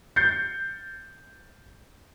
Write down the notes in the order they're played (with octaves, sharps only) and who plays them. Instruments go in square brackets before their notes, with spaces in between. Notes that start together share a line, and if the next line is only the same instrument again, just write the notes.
[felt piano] G6 A6 C7 C#7